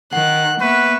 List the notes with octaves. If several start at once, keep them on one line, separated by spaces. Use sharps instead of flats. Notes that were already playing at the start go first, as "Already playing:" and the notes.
D#3 F#5 F#6
A#3 B3 B4 E5 C#6